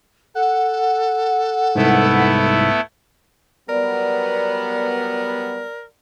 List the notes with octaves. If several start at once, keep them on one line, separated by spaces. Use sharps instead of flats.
A4 F#5
C2 G#2 A3 B3 E4
F#3 G3 B3 A#4 D5